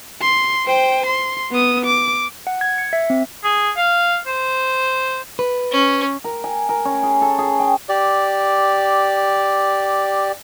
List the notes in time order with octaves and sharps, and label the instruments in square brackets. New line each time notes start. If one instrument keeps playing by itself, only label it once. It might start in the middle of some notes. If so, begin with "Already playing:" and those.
[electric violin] C6
C5 G5
C6
B3 D#6
D6
[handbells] F#5
G#6
C#7
E5
C4
[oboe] G#4
F5
C5
[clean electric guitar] B4
[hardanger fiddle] C#4
[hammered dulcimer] A#4
G#5
A#4
C#4
G#4
A4
G#4
G5
[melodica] G4 D5